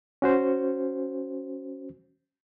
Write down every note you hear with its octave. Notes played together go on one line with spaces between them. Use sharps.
C#4 F#4 C5